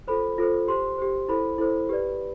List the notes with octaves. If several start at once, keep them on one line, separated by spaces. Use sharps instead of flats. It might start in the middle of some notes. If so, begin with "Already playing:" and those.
F4 A4 C5 B5
F4 A4 C5
G4 C5 C6
G4 C5
E4 A4 C5 B5
E4 A4 C5
G4 B4 D5